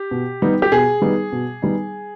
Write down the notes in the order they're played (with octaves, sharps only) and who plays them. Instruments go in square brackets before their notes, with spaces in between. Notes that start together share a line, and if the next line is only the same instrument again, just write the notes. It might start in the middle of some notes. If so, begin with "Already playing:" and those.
Already playing: [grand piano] G4
B2
G3 B3 D#4
G4
B2 G#4
G3 B3 D#4
B2
G3 B3 D#4